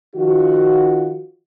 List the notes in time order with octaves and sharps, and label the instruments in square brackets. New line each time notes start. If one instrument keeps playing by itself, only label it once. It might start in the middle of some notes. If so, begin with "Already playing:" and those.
[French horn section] D#3 F3 F4 F#4